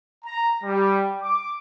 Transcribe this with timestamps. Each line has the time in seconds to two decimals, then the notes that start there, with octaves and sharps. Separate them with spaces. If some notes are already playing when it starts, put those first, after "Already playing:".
0.24 A#5
0.63 G3
1.21 D6